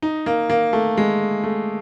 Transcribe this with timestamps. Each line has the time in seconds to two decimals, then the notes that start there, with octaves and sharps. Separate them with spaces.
0.02 D#4
0.26 A#3
0.50 A#3
0.73 A3
0.97 G#3
1.44 A3